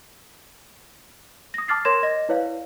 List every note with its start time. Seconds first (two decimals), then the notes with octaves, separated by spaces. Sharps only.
1.54 D#6 A#6
1.68 A5 D6 F6 A6 C7
1.85 A#4 C#5 C6 G#6 A#6 E7
2.03 D#5 A#6
2.29 E4 B4 C#5 D5 F5